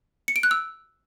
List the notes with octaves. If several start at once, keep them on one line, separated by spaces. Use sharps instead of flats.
C#7
D7
F#6
E6